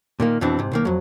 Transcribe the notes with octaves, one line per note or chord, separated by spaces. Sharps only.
A#2 D#3 A#3
F2 B2 E3 C4 D4
G#2 C3
B1 D#3 A#3
F2 F#3